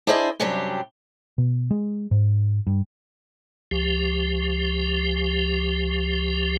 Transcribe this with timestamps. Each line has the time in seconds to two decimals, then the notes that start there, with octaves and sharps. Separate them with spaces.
0.07 D4 E4 G#4 C5 D5 D#5
0.40 F#2 C3 F#3 G3 D4 G4
1.38 B2
1.71 G#3
2.11 G#2
2.67 G2
3.71 C#2 F3 G4